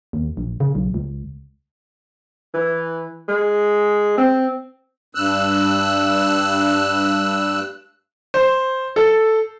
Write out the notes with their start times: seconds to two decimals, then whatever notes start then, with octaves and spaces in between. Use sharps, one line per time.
0.13 D#2
0.37 A#1
0.60 C#3
0.75 B1
0.94 C#2
2.54 E3
3.28 G#3
4.18 C4
5.15 G2 E6 F#6
8.34 C5
8.96 A4